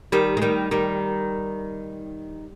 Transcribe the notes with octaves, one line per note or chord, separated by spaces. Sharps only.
D#3 G3
G#3
D#3 G3
D#3 G3